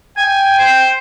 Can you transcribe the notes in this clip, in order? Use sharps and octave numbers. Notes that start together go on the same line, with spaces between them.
G5 G#5
C5